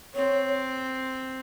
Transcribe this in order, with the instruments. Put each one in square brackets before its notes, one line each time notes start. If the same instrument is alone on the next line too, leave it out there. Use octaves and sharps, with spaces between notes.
[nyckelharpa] C4 [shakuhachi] C#5